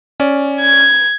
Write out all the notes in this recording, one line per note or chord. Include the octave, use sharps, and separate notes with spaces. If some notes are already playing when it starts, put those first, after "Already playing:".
C#4 D5
G#6